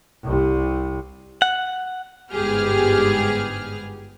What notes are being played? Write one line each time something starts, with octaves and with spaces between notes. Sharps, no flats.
C2 C3
F#5
G1 G#2 B3 G4 G#4 F6